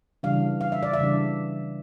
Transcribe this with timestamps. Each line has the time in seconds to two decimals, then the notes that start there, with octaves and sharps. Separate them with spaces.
0.23 C#3 E3 G3 D4 F5
0.61 F5
0.72 E5
0.83 D5
0.94 E5
0.99 C#3 E3 G3 D4